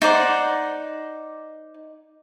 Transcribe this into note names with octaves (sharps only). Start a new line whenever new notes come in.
D#4 C5 D5 F#5